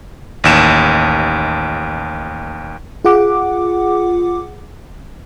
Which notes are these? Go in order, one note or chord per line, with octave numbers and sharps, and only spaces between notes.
A1 D#2 E7
F4 G#4 F#5 D6